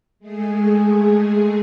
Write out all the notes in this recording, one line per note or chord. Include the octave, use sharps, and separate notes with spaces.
G#3 A3 G#4